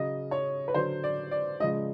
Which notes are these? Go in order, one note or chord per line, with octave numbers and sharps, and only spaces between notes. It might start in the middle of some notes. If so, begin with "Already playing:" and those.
Already playing: C#3 F#3 D#5
C#5
B4
D3 F#3 C5
D5
D5
C#3 F3 G#3 D#5